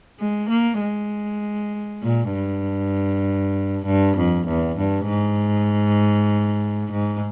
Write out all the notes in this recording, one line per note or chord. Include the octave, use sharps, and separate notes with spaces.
G#3
A#3
G#3
A#2
G2
G2
F2
E2
G2
G#2
G#2